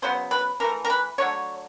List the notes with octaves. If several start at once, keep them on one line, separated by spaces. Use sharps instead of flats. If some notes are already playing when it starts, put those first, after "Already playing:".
C#3 F#3 B3 C5
B4
E3 A3 A#4
A#4
B4
D3 F#3 A3 C#5